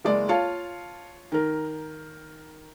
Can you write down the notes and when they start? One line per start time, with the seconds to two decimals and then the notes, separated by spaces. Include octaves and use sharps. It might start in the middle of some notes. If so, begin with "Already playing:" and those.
0.04 F#1 G#3 D5
0.29 F4 C#5 F5 A5
1.32 D#3 A#4